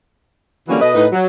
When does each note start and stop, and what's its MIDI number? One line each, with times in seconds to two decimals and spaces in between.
0.68 0.77 50
0.68 0.77 52
0.68 0.77 54
0.68 0.77 55
0.68 0.77 58
0.68 0.77 61
0.80 0.93 47
0.80 0.93 69
0.80 0.93 71
0.80 0.93 75
0.94 1.07 45
0.94 1.07 63
0.94 1.07 71
1.12 1.26 54